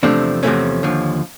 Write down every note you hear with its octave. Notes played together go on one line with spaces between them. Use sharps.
E2 C3 F3 A3 C4 D4
E2 C3 F3 A3 C4 C#4
D#2 D3 F3